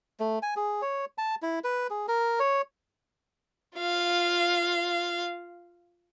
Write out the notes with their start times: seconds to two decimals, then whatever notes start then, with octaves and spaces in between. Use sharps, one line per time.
0.20 A3
0.43 G#5
0.56 G#4
0.82 C#5
1.18 A5
1.42 E4
1.64 B4
1.90 G#4
2.08 A#4
2.39 C#5
3.78 F4 F5